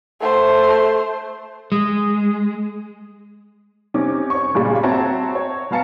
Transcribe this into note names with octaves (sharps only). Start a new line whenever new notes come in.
A3 C5
G#3
C3 C#4 D#4 D6
C#5 C#6
B1 G2 A#2 C#3 G3 G#3
C4 F#4 C#5 E5 A5 A#5
C#5
B2 B3 F5 A5 A#5 C#7